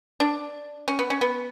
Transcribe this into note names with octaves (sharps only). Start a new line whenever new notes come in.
D4
C#4
B3
C#4
B3